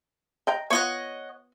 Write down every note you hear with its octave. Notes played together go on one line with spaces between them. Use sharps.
D#5 G5 A#5
B3 F4 C#5 D#5 F#5